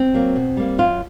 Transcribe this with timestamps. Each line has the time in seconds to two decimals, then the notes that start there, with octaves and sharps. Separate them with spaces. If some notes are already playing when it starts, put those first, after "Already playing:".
Already playing: C4
0.14 F#3 A#3
0.35 B2
0.57 G3 A#3
0.78 F#2 F4